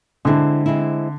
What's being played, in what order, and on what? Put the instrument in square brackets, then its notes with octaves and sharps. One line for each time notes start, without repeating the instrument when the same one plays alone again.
[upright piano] D3 [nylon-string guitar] G#3 C4 E4
[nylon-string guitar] G#3 C4 E4